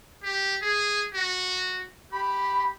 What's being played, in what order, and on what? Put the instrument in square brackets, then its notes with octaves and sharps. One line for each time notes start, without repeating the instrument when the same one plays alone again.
[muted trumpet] G4
G#4
F#4
[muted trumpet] G4 [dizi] B5